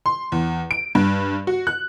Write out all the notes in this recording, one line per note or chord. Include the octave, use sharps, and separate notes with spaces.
C6
E2
D7
G2
F#4
F#6